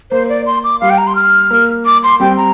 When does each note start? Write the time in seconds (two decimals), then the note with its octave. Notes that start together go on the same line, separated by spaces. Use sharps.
0.11 A#3 C5
0.29 D5
0.46 C6
0.64 D6
0.81 G3 F5
0.90 G5
0.98 A#5
1.07 C6
1.16 F6
1.51 A#3
1.86 D6
2.04 C6
2.20 G3 C4 G5
2.37 A#5